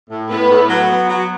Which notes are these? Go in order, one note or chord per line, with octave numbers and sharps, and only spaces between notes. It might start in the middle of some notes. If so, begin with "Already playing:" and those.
A2
A2 B3 B4
A2
F#3
B3
F#3